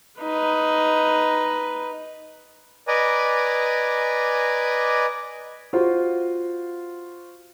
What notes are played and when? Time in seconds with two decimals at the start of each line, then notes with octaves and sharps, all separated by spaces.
0.21 D#4 B4
2.88 B4 D5 D#5 G#5 A#5
5.73 F4 F#4 C5 F5